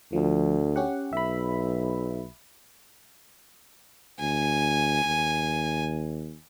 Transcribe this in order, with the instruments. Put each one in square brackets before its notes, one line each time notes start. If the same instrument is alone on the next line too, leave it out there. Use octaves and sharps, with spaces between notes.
[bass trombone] D2 [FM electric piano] F3
[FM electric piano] C#4 G4 F#5
[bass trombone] B1 [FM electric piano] E5 B5
[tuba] D2 [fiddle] G#5
[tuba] D#2